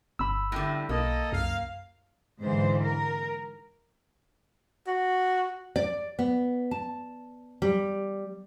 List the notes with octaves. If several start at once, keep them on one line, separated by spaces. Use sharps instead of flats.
G1 B5 E6
A2 D3 G3
B1 A#3 A4 D#5
C2 F#2 F5
G#2 D3 E3 C5
A#4
F#4
D5
B3
A5
G3